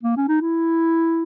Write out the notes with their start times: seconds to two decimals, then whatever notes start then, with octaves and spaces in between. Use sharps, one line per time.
0.03 A#3
0.17 C#4
0.29 D#4
0.41 E4